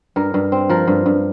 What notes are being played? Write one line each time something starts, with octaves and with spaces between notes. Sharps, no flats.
G2 A#4
G2
C4
F3 A#4
G2
G2